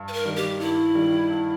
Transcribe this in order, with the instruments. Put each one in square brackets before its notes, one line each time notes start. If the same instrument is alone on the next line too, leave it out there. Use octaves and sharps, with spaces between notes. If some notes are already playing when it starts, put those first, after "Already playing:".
Already playing: [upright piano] G2
[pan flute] B4
A#4
[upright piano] D#3 G3
[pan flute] G4
[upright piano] G2 [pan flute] E4
[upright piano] D#3 G3
G2